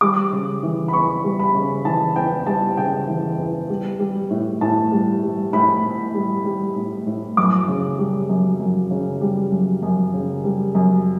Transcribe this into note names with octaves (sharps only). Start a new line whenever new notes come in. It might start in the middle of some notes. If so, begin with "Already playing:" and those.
G3 D6
C#3
E3
B5
E2 C#6
G3
B5
C#3
E3 A5
E2 G5
G3 A5
C#3 G5
E3
E2
G3
G3
A2
A2 A5
G3
G3
A2 B5
A2
G3
G3
A2
A2
F#2 D6
C#3
G3
F#2
F#2
C#3
G3
F#2
F#2
C#3
G3
F#2